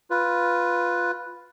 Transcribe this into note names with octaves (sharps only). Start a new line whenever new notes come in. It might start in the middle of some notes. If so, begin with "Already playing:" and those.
F4 B4